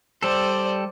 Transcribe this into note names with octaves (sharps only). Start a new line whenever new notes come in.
G3 A4 C5 D5